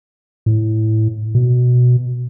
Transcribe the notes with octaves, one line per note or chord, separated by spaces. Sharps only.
A2
B2